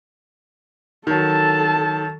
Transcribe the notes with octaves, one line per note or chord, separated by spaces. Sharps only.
D#3 F#3 A4 A5